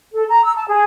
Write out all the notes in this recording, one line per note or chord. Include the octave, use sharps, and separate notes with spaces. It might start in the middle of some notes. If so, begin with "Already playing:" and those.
A4
A#5
E6
A5
G#4